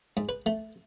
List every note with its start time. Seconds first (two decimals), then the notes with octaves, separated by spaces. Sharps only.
0.17 G#2
0.29 B4
0.46 A3